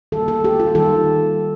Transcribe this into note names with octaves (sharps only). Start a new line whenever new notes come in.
D#3 G3 A#3 A4
A4
G4
F4
D#3 G3 A4